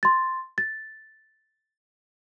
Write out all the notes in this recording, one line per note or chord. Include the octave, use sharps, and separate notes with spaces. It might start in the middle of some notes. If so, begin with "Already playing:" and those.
C6 A6
A6